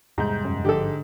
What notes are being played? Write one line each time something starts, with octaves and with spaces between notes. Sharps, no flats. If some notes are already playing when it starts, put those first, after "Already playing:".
E2 G#2 C3 G3 A#5 G6
F#2
G#1 G2 D3 F3 G4 A4